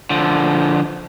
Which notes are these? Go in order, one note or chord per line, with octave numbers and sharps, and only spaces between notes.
D3 F3